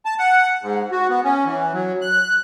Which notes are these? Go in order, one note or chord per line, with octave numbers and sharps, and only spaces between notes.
A5
F#5
G#2
F#4
B3
C#4
E3
F#3
F#6